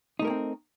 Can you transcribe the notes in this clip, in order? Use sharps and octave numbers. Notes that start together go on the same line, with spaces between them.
A3 A#3 C4 D#4 A#4